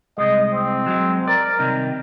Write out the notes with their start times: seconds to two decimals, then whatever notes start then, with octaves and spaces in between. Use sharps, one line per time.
0.18 C2 G#3 D#5
0.52 C4
0.86 F#3 G#3
1.27 A#4 D5
1.59 C3 D#3 G3